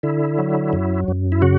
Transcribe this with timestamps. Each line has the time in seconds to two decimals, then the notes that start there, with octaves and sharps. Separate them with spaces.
0.03 D3 E4
0.38 F#3
0.73 F#2
1.08 F#2
1.32 E4
1.42 C#3 F#4